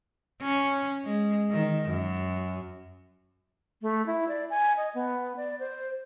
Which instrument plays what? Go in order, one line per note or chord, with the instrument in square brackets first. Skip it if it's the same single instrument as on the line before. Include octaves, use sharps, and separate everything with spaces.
[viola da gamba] C#4
G#3
D#3
F#2
[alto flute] A3
E4
D5
G#5
D#5
B3
D5
C5